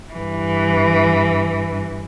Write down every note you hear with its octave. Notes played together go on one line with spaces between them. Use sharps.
G2 E3